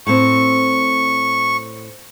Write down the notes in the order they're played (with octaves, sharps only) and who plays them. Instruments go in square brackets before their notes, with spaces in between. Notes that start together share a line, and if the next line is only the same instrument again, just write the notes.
[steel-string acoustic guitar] A2 C4 [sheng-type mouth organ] C#6